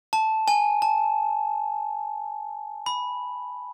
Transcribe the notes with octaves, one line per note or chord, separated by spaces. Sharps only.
A5
G#5
A5
B5